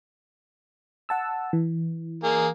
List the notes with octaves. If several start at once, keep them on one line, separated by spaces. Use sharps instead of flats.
F#5 A5 E6
E3
A#3 G#4